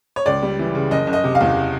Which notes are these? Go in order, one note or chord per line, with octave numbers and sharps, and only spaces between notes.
C#5
C#2 D5
G3
E3
C#3
F#1 D#5
F#1
D#5
C3
F5
E2